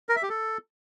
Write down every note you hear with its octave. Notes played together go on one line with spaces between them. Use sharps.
A#4
E5
G4
A4